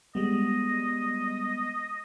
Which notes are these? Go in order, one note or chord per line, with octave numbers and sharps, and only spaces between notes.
G3 G#3 B3 D#5